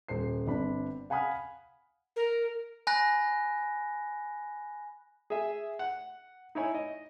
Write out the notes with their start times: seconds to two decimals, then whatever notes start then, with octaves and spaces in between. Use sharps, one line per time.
0.08 D#1 C5 C7
0.47 G1 C4 D4 B5
1.10 F5 F#5 G#5 B5 D#6 F6
2.16 A#4
2.87 G#5 B5 F#6 A#6
5.30 G#4 E5
5.79 F#5
6.55 D#4 E4 C#5 G#5
6.75 D#5